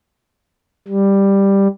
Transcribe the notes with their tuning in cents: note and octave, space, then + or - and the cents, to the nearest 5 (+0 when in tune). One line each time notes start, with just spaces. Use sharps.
G3 +5